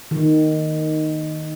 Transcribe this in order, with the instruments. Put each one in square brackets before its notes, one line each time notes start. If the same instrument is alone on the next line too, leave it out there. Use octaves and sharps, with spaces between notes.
[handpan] D#3